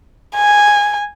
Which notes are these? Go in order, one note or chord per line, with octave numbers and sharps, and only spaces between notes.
G#5